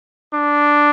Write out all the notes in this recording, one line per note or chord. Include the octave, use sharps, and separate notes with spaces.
D4